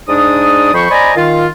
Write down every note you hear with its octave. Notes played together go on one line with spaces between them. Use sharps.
G#2 D4 D5 D#6
F2 F3 C5 B5 C#6
C5 D5 D#5 G#5 A#5 B5
D#3 F4